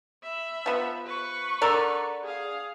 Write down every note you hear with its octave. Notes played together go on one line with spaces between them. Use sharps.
E5 B5
F3 B3
B4 C#6
D3 A#4 D5
G#4 F5